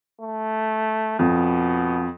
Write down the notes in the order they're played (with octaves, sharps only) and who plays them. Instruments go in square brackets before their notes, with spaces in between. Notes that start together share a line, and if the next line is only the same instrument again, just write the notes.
[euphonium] A3
[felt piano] F2 [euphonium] B2